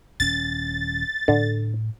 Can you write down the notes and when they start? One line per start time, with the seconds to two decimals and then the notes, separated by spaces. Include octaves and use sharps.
0.20 D#1 C#4 A6
1.28 A2 D3